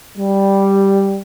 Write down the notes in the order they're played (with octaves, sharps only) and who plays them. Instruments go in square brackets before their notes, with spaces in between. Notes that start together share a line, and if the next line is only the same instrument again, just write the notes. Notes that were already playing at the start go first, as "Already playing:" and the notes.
[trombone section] G3